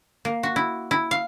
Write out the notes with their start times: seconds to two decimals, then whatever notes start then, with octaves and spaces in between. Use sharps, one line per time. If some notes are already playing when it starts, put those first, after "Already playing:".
0.25 A#3
0.43 F#4
0.56 E4
0.91 E4
1.11 F5